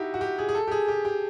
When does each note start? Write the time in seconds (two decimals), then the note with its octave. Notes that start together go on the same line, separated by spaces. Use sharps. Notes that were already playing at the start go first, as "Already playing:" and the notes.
Already playing: D#4 E4 F#4 G4
0.14 F#4
0.21 G4
0.38 G#4
0.49 G#4
0.55 A4
0.67 G4
0.71 G#4
0.88 G4
1.05 G4